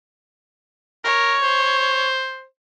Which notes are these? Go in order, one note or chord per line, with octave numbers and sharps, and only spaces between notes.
A#4 C#5
C5